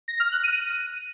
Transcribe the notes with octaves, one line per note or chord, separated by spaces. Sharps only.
A#6
F6
F#6
D#7